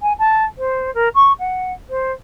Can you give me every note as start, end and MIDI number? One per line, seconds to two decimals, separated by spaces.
0.02 0.13 80
0.19 0.44 81
0.58 0.93 72
0.95 1.09 70
1.15 1.33 85
1.39 1.73 78
1.90 2.11 72